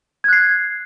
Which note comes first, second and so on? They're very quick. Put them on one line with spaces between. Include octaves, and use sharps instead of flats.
G#6 F#6 C7